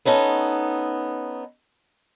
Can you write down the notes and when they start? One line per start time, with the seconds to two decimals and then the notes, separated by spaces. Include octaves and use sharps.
0.05 B3 C#4 D#4 A4